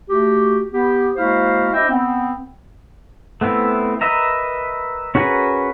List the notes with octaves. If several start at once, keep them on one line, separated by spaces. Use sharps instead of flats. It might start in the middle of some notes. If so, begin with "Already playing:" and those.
A3 F#4 G4
B3 G4
G#3 A#3 E4 F#4 C5 F5
D4 E4 C5 D#5 E5 G5
B3 C4
A3 B3 C4 E4
A#4 B4 D#5 E5 A#5
C#4 F#4 G#4 A#4 B4